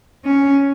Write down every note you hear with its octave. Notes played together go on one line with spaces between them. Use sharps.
C#4